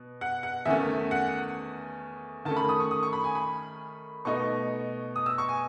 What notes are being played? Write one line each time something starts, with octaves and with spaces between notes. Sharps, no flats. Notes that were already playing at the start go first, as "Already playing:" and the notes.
Already playing: B2
F#5
F#5
E2 D#3 A3 C#4 E5
F#5
D#3 A3 C#4 A5
B5
D#6
C#6
D#6
C#6
B5
G#5
B5
B2 A3 D#4 C#6
D#6
E6
C#6
G#5